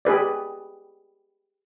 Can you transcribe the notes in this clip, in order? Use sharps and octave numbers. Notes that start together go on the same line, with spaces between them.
G4 G#4 B4 D5